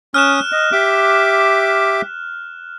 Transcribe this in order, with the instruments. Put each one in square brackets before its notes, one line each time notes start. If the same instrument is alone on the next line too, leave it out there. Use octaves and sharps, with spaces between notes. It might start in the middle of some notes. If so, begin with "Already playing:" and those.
[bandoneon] C#4 D#6 [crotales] F6 F#6 E7
[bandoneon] D#5
G4 E5 D6